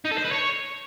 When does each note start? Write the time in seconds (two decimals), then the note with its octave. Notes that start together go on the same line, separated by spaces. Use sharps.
0.05 D#4
0.11 A4
0.18 C5
0.25 B4
0.31 C#5